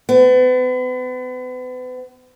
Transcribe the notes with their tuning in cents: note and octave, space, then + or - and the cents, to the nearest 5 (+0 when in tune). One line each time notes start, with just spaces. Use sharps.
B3 +40